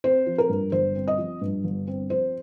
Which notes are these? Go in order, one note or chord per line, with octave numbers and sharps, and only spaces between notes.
C4 C5
F3
A#4
G2
G1 C5
C4
D#5
F3
G2
G1
C4
F3 C5